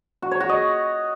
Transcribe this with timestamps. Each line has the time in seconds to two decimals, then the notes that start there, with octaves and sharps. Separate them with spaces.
0.22 F#4
0.31 C#5
0.40 F#4
0.49 D#5